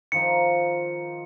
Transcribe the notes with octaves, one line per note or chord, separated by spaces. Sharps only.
D#3 F3 D#4 C#7